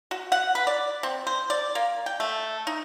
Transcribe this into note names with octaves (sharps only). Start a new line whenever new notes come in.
F#4
F#5
B4
D5
C4
C5
D5
A#3
G5
A3
D#4